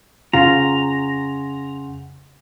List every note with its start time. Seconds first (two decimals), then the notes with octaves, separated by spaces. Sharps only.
0.33 F2 C#3 F4 F#5 A#5 C6